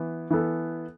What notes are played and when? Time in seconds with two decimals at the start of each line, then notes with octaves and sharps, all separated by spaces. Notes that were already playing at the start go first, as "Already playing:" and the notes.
Already playing: E3 B3
0.30 E3 B3 A4